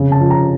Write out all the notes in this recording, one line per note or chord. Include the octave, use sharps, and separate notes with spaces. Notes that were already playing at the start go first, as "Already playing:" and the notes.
Already playing: F1 C#3
A5
F2
A#5